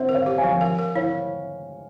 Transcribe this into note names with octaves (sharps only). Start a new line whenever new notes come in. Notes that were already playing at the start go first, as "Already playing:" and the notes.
Already playing: C4 C5 C#5 E5
A#4
C#5 F5
G4
F5 G#5
F3
A#4 F5 G#5
A#4
E4 C#5 F5